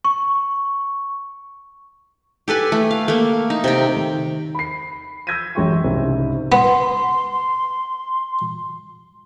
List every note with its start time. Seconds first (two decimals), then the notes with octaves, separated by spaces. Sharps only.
0.05 C#6
2.48 G4 A4 B4 G#5
2.72 A3
2.91 F5
3.08 A3 A#3
3.50 D#4
3.64 C3 G5
3.96 D#3
4.55 B5 C7
5.27 E6 G6 G#6 A#6 B6 D#7
5.55 A1 F#2 G#3 G5 C6 C#6
5.84 C2 G#2 C#3
6.52 B3 C6